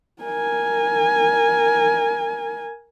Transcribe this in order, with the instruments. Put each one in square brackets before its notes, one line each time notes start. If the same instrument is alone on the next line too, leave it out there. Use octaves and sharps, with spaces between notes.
[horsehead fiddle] A#4 G#5